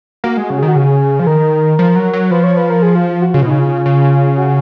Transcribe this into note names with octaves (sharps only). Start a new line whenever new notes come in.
A#3 F#4
G#3 F#4
C#3
D#3 G#4
F#4
C#3 G#4
F3 G#4
D#3 A#4
F3
F#3
F#3
F3 B4
C#5
B4
A#4
G#4
F4
F4
F#4
C#3 F4
B2
C#3 D#4
F4
C#3
F#4